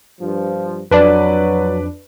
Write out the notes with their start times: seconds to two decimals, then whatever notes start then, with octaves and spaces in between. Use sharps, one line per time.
0.21 G2 F3
0.91 F2 F#3 D4 B4 D5